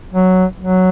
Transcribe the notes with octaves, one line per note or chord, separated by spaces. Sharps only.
F#3
F#3